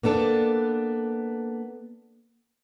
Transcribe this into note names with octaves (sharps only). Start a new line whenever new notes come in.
A#3 B3 D4 A4